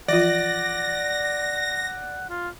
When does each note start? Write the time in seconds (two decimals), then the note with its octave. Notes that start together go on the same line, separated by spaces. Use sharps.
0.08 E3 F3 F4 D5 F#5 A#6
2.29 F4